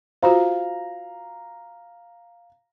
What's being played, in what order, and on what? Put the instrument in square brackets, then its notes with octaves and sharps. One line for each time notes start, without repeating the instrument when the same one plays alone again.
[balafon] F4 F#4 C5 [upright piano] F5 A#5